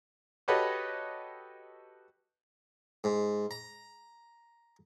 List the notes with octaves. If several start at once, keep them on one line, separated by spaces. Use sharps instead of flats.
F#4 G4 A4 B4 C#5 D#5
G#2
A#5